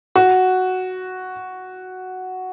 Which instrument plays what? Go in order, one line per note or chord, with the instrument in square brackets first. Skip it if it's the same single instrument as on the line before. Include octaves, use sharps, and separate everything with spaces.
[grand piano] F#4